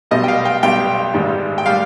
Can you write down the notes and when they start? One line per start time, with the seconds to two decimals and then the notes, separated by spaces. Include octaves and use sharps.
0.11 B1 B2 G3 D#5
0.24 G5
0.28 F5
0.45 G5
0.63 B1 B2 G3 G5
1.14 G#1 G#2 G3
1.58 G5
1.66 G3 F5